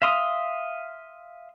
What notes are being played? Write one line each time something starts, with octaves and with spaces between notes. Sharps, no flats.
E5 F5 C6 D#6